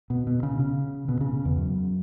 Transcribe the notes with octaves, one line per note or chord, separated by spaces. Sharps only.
B2
B2
C#3
C#3
B2
C#3
C#3
E2
F#2